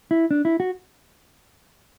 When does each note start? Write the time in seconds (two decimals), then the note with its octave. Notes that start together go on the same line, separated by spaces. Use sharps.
0.11 E4
0.31 D4
0.45 E4
0.60 F#4